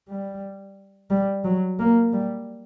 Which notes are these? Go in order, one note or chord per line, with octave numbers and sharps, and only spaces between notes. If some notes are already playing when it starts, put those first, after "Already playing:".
G3
G3
F#3
A#3
G3